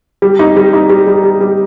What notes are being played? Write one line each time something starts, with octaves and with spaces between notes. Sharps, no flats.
G3
D#4
G3
D#4
G3
G3
G3
G3